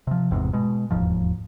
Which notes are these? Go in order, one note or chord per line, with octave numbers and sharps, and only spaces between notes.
C3 F3
G1 E2 G#2 C3
B2 G#3
E1 D#2 G#2 F3